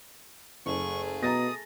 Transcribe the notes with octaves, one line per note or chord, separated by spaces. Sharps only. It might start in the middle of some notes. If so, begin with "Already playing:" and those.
F#1 A3 G#4 C#6
B2 A#5 D#6 A6 A#6